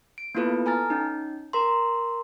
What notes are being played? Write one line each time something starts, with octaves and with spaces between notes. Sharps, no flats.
D7
A#3 B3 E4 F4 A4 B4
A4 G#5 A#5 F6 A6
C#4 D#4
A#4 A#5 C6